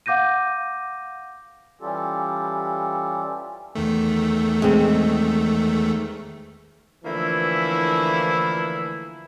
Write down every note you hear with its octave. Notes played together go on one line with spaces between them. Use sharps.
F5 F#5 D6 G6 A#6 D#7
E3 G3 C#4 F4 G4 A4
E2 D#3 A3
G#3 C4
D3 E3 F3 A3 A#3 E4